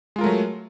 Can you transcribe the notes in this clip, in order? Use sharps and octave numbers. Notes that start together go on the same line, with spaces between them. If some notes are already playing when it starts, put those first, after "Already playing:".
F#3 G#3 A3 F4 A#4